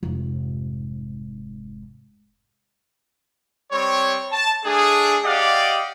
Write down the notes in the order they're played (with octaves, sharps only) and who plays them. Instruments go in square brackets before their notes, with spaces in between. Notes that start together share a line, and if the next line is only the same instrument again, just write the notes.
[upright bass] F1 G#2
[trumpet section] G3 C4 C#5
A5
A3 D4 G#4
G4 D5 D#5 F5 F#5